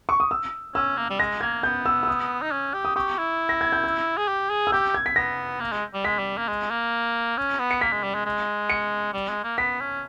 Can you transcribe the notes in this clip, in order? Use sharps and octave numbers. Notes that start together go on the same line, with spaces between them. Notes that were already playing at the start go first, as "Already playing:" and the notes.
C#6
D#6
E6
C#4 E6
A#3
G3
G#3 A#6
A#3 G#6
B3 G6
E6
E6
D#6
D#4
C#4
G4
D#6
G4 C#6
E4
A#6
G#6
G6
E6
G#4
G4
G#4
E6
G4 G6
G#6
B6
B3 A#6
A#3
G#3
G3
G#3 B6
G3
A#3
G#3
A#3
C#4
B3
C#7
A#3 B6
G#3
G3
G#3
G#3
C#7
G3
G#3
A#3
B3 B6
C#4